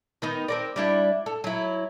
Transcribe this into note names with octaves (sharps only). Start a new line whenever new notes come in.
D#3 B3 D#4
C4 A#4 D5
G3 D4 E4
A4
F#3 E4